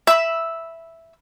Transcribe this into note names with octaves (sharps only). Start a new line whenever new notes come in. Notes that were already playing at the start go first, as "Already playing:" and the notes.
E5 B5 E6